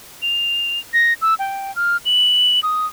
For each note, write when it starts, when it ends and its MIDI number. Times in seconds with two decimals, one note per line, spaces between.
0.22 0.79 101
0.93 1.14 94
1.22 1.34 88
1.39 1.74 79
1.76 1.97 89
2.05 2.60 102
2.63 2.86 87